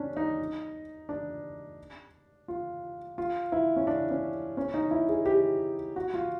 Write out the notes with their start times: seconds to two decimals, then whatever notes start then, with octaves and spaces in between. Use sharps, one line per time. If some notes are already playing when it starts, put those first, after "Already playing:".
Already playing: C#4 D4
0.17 D#4
1.09 D4
2.48 F4
3.18 F4
3.52 E4
3.76 C#4
3.87 D4
4.11 C#4
4.57 C#4
4.74 D#4
4.91 E4
5.09 G#4
5.26 G4
5.96 F#4
6.14 F4